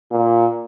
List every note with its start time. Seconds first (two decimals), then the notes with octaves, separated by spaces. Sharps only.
0.11 A#2